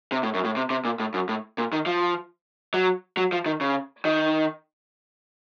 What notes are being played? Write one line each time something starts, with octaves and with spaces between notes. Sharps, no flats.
C3
A2
F#2
A2
C3
C3
A#2
A2
F#2
A2
A#2
D#3
F3
F#3
F#3
F3
D#3
C#3
D#3